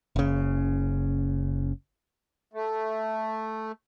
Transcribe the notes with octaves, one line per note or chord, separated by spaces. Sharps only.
F#1 C#3
A3